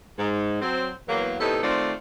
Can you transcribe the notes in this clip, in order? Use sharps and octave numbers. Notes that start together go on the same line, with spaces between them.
G#2
F#3 C4 C5
E2 F#3 A#3
A2 C3 B3 D#4 A4
D#3 A3 C4 F4 C5 D5